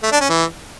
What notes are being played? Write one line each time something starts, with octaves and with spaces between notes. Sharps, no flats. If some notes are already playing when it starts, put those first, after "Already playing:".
A3
D4
C#4
E3